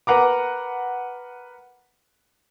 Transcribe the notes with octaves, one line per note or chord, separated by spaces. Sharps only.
A#4 B4 F#5 A#5 D6